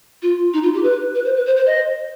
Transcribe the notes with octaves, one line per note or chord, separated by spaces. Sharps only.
F4
D#4
F4
G4
B4
B4
C5
B4
C5
C5
D#5